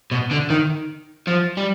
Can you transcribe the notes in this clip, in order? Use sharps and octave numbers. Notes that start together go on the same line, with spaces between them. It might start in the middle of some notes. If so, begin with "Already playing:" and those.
B2
D3
D#3
F3
G3